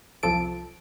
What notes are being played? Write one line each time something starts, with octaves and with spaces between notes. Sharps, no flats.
C2 F3 A4 D7